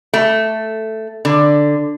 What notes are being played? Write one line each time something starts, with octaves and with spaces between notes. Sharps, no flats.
A3
D3